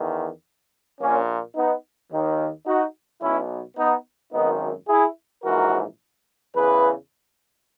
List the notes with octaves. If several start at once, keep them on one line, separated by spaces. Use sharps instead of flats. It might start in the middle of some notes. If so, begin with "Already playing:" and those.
Already playing: E2 D#3
A#1 A#2 A#3 C#4
B3 D#4
D#2 D#3
D#4 F#4
B1 B2 C#4 E4
B3 D#4
G#1 F#2 D#3 B3 D#4
E4 G#4
A#1 G#2 E3 F#4 A#4
E2 C#3 E3 G#4 B4